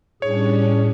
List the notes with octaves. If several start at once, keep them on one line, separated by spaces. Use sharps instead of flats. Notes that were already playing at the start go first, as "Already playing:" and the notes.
A2 G3 C#4 D4 G#4 C#5